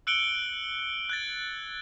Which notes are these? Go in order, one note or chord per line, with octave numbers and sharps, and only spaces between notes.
E6 F#6 C#7 D7 F#7 G7
F#6 G#6 A6